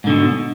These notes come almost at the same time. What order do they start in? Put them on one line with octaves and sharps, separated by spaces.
G#2 D3 B2